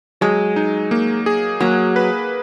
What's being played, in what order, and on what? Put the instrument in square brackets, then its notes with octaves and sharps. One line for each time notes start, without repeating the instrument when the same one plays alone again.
[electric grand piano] F#3 [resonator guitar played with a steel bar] G#3
[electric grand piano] D#4
A#3
G#4
[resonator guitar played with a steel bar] F#3 [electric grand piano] A#3
[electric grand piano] B4